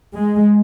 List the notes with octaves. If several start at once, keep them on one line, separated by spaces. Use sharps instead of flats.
G#3